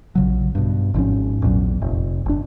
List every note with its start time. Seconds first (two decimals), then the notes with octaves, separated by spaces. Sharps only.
0.15 A#1 C#3 F#3
0.55 G2 B2
0.94 G#1 G#2 F3 C#4
1.42 A#1 E2 A#2 F#3
1.82 F1
2.26 G1 D4